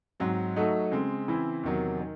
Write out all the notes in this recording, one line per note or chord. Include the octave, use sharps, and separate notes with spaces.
G#2 F#3 C4
F#3 A3 D#4 F#4 A4
C#3 G#3 C4
C#3 E3 C4 E4
E2 C3 D#3 F#3
D#3